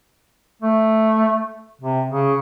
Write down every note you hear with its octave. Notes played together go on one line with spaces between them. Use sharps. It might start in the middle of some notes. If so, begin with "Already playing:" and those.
A3
C3
C#3